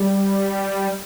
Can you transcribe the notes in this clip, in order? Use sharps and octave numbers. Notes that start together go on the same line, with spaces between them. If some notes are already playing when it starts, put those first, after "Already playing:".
Already playing: G3